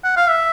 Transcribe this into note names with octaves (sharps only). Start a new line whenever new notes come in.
F#5
F5
E5